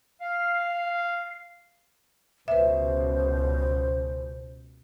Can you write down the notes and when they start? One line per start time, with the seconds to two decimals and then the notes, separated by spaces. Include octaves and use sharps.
0.20 F5
2.48 C#2 B2 B4 C5 E5